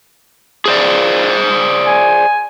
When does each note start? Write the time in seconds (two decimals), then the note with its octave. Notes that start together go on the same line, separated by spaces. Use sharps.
0.66 G#4 C5 D5
1.87 G#5